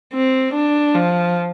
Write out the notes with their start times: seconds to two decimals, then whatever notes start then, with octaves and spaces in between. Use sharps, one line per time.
0.14 C4
0.54 D4
0.95 F3